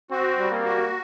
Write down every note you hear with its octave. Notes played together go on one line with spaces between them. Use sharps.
C4 F#4
G3
A#3
F#4